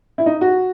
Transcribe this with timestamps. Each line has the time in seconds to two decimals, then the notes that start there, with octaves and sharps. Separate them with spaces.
0.18 E4
0.26 D#4
0.41 F#4